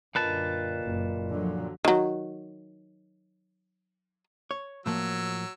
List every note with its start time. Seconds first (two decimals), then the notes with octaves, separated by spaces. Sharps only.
0.15 F#2 A#2 D3 F4 A#4 B4 D#5 A5
0.81 F#1
1.32 D3 F3 F#3
1.85 D#3 F#3
4.51 C#5
4.86 A2 F3 F#3 A#3 E6